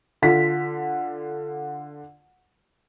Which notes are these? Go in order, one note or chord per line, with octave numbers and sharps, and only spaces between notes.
D3 F4 B6